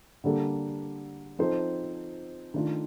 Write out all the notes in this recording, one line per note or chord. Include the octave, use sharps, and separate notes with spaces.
D3 G3 A#3 D4 A4
F3 C4 D#4 A4 C5
D#3 A3 D4 F4